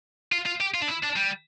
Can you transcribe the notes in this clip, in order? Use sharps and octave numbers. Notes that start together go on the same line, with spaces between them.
F4
F4
G4
F4
D4
E4
D4
G3